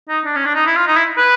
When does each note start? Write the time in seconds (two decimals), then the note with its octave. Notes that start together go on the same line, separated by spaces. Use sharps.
0.09 D#4
0.25 D4
0.36 C#4
0.45 D4
0.55 D#4
0.67 E4
0.76 F4
0.87 D#4
0.96 E4
1.18 B4